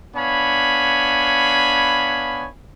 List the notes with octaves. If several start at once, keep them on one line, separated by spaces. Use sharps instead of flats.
B3 D4 C#5 F5 G#5 B5